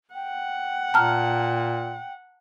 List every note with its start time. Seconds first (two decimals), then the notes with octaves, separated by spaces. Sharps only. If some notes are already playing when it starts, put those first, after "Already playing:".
0.14 F#5 G5
0.94 A#2 A5 A#5 F6